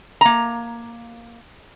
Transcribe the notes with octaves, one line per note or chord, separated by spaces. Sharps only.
A#3 A#5